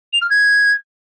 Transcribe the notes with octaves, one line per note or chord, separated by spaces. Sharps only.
F7
F6
G#6